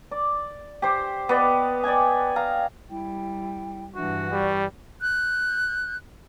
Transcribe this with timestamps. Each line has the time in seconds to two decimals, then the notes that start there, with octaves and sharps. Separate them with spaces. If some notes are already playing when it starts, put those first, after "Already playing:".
0.11 D5
0.82 G4 C5
1.29 B3 B4 D5 D#5
1.84 D5 D#5 G5 G#5
2.36 F5 A#5
2.89 G3 E4 G5
3.95 G2 E3 D4 F#4 E5 F#5
4.32 G3 D5 C#6
5.02 F#6 G6